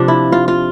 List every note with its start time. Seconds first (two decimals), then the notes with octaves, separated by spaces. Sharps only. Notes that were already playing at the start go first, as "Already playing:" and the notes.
Already playing: C3 F3 D4
0.08 E4
0.32 F4
0.48 F4